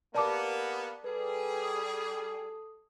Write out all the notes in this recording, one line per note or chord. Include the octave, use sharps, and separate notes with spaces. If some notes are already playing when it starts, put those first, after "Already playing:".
A#3 B3 G4 A#4 D5 A5 D6
G3 G#4 A4 B4
D#6